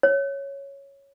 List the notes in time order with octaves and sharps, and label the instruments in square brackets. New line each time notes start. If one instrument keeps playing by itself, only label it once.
[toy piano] C#5